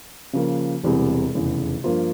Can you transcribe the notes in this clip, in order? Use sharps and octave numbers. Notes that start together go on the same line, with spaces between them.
C#3 F3 A#3
E1 E2 C3 G3
F1 E2 C#3
G2 F3 A#3 F4 C5